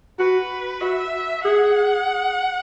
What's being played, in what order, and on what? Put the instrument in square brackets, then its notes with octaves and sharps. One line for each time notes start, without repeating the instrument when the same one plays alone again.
[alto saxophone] F#4 [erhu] B4
[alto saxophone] F#4 [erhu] E5
[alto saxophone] G#4 [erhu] F#5